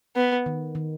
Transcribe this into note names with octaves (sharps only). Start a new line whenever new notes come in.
B3
D#3
D#3